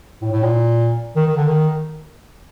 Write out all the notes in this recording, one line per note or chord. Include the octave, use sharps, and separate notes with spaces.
A2
A2
A#2
D#3
D#3
D3
D#3